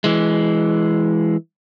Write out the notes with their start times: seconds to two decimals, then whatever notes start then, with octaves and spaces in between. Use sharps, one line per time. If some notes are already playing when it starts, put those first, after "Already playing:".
0.04 E3 G#3